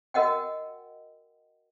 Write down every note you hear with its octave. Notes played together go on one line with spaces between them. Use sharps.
F#4 A#4 D#5 F#5 G5